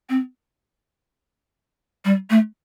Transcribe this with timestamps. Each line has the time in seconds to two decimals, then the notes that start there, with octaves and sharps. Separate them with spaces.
0.09 C4
2.05 G3
2.30 A3